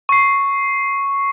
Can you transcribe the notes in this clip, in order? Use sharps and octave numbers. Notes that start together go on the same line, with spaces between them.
C#6 C7